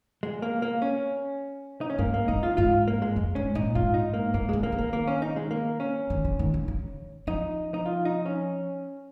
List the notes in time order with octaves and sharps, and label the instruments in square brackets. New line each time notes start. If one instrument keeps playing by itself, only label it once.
[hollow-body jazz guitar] G#3
A#3
A#3
C#4
D#4
C#4
[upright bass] G#2 [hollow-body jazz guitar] A#3
[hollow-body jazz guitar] A#3
[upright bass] C#3 [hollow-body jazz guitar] D#4
[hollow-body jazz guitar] F4
[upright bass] G#2 [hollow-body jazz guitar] F4
[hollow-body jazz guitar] A#3
G#3
[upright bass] F2
[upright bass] G#2 [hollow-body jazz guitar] C#4
[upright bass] A#2 [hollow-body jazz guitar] D#4
[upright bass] G#2 [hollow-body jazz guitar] F4
[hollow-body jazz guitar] D#4
A#3
[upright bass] G#2 [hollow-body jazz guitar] A#3
[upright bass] C#3 [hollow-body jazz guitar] G#3
[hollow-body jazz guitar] A#3
[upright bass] D#3
[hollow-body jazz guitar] A#3
[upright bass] D#3 [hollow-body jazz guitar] A#3
[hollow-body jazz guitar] C#4
D#4
G#3
A#3
C#4
[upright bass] D#3
C#3
D#3
C#3
C#3
[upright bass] F3 [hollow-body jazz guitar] D#4
[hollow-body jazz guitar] D#4
F4
D#4
C#4